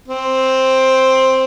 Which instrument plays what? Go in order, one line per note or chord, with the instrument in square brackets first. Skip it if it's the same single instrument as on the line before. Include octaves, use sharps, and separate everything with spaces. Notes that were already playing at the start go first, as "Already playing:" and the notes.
[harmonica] C4